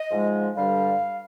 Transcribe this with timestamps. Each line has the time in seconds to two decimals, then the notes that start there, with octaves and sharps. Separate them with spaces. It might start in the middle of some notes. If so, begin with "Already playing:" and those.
Already playing: D#5
0.09 G#2 F3 G#3
0.56 G2 D3 G3 F5